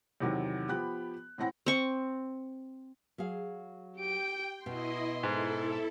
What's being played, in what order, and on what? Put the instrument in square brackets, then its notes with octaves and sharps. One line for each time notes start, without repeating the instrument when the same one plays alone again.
[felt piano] E2 C3 D#3 F#3
F3 B3 G4 B5 F#6
A2 E3 C4 F#5 G5 A#6
[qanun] C4 C#6
[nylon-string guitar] F#3 G#4 F5
[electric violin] G4 D7 [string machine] G5
[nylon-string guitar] B2 [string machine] E4 D#5 [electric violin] C6
[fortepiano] G#2 [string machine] E4 A4